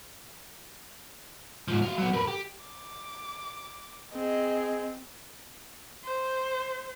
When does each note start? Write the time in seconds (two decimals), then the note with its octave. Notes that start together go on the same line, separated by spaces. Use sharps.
1.68 G#2 F3
1.82 F#4 F5
1.97 F#3 B3
2.13 A#4 B4
2.28 G4
2.64 D6
4.14 C4 G#4 D#5
6.05 C5